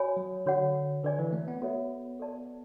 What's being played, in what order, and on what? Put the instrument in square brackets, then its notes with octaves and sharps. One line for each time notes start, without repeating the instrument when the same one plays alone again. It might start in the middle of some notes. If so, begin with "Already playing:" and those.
Already playing: [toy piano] F#4 C#5 G#5 B5
[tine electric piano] F#3
[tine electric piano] D3 [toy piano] F#4 C#5 F#5
[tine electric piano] D3 [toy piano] B4 D5 G#5
[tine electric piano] E3
A3
B3
[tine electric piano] B3 [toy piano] F#4 A4 C#5 E5
[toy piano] A4 D5 A5